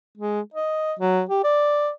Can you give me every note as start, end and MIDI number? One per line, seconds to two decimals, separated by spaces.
0.18 0.41 56
0.54 0.93 75
0.99 1.23 54
1.29 1.43 67
1.44 1.90 74